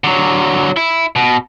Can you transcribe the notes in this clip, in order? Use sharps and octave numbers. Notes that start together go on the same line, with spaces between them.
D3 F#3
E4
B2